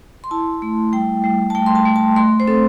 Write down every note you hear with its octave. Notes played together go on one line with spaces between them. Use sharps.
C6
E4 A5
A3
G3 G5
G3
A5
A3 G5
C6
A5
A3
A5
A3 C6
C5
C4 A4